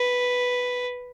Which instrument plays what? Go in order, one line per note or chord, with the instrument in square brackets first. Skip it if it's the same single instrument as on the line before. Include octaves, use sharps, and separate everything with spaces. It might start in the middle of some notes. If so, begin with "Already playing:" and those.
Already playing: [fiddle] B4